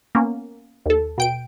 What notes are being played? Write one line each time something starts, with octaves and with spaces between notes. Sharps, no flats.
A#3 B3 C#4
D#2 A4
B2 G5 D7